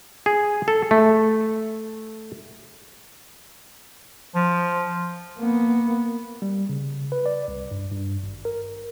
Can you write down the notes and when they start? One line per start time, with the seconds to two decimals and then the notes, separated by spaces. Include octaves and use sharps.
0.26 G#4
0.68 A4
0.91 A3
4.35 F3
5.38 A#3 B3
6.42 G3
6.69 C#3
7.12 B4
7.26 D5
7.48 C2
7.71 G2
7.92 G2
8.23 G#1
8.45 A#4